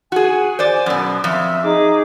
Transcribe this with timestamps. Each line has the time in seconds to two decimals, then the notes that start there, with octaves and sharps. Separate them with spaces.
0.12 F#4 G#4 G#5
0.59 C5 D5
0.86 F#2 B2
1.24 F2 E5
1.62 D#4 G#4 D6